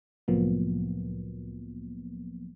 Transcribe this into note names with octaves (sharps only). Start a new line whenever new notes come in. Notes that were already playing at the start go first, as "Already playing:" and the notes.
C2 A2 F3 F#3 A#3 B3